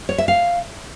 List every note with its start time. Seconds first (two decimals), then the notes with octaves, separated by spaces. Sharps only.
0.09 C#5
0.18 E5
0.28 F5